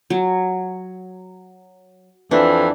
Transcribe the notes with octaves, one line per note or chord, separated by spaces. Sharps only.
F#3
F2 E3 D4